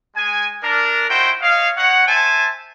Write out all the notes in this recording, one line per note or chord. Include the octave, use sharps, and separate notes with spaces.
G#3 G#5
D4 A#4
D#4 E4 F#4 C5 G5
C#5 D#5 F5
D#4 C#5 F#5
C5 E5 G#5 A5